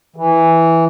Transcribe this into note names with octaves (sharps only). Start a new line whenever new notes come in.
E3